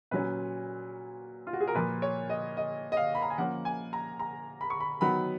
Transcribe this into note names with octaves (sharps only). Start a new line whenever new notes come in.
A#2 F#3 C#4 B4
F4
F#4
G#4
A#4
A#2 F3 A#3 B4
C#5
D#5
D#5
D#5
F5
B5
A#5
G#5
F3 A#3 C#4 F#5
G#5
A#5
A#5
B5
C#6
B5
D#3 F#3 B3 B5